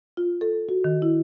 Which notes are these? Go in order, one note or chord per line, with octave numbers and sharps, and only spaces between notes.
F4
A4
F#4
D#3
E4